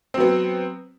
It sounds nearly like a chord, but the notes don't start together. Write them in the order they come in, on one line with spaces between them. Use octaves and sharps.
C4 F#3 B3